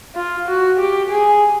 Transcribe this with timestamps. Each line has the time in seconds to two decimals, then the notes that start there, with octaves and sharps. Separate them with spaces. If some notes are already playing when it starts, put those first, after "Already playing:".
0.15 F4
0.47 F#4
0.79 G4
1.10 G#4